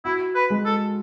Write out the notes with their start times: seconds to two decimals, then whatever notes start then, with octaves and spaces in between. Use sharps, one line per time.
0.04 E4 F#4
0.35 B4
0.50 G#3
0.65 A4